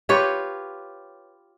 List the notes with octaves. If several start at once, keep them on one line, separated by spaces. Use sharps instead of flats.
F4 G4 B4 C#5